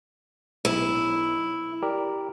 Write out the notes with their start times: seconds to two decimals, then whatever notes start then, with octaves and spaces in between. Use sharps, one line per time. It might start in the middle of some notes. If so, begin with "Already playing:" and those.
0.65 B1 E4
1.82 G4 A#4 D5